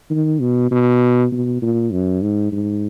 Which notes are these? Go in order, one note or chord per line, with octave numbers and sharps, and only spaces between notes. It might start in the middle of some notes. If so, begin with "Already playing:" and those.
D#3
B2
B2
B2
A#2
F#2
G#2
G#2